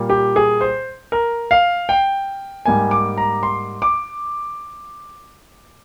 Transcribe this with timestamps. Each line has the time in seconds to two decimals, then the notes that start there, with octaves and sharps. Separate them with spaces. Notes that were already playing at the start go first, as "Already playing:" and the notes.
Already playing: A#2 G3 A#3
0.10 G4
0.36 G#4
0.61 C5
1.12 A#4
1.51 F5
1.89 G5
2.65 G#2 G3 A#3 G#5
2.91 D6
3.17 A#5
3.43 C6
3.82 D6